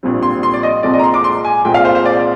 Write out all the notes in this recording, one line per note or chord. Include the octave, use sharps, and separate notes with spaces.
A#1 A#2 G3 C4
C6
C6
D5
D#5
C2 A#2 G#3 C4 D5
D#5
A#5
C6
D6
C6
G#5
C2 A#2 G#3 C4 G5
F5
C5
C5
D5